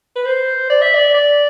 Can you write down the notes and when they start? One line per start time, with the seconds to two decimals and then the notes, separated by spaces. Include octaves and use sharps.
0.16 B4
0.25 C5
0.70 D5
0.82 E5
0.94 D5
1.14 D5